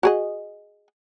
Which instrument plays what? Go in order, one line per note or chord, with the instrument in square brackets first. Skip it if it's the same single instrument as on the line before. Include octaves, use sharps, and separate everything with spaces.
[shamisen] F#4 G#4 D#5